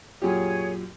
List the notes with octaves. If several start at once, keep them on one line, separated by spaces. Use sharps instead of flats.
F#2 A#2 G4 G#4 C#5